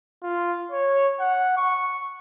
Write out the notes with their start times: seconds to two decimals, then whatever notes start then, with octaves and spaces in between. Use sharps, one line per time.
0.23 F4
0.72 C#5
1.20 F#5
1.57 C#6